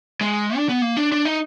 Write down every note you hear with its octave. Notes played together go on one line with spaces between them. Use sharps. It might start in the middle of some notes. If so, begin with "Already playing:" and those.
G#3
D4
B3
A#3
D4
D4
D#4